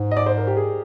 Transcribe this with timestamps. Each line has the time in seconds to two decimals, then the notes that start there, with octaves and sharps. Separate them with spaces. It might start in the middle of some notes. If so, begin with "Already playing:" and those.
Already playing: G#2
0.11 D#5
0.17 D5
0.26 C5
0.37 A#4
0.47 G4
0.57 G#4